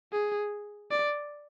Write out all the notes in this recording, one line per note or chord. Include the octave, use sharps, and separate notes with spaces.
G#4
D5